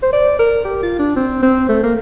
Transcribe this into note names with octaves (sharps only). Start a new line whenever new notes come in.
C5
D5
A#4
G4
F4
D4
C4
C4
A3
A#3